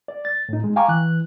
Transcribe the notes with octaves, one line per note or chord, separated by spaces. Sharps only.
D5
A6
A2 D#4
G#3
F5 G5 G#5 A#5 C#6 D6
E3 F#6